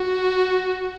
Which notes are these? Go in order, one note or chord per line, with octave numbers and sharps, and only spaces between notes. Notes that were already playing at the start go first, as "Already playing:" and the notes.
Already playing: F#4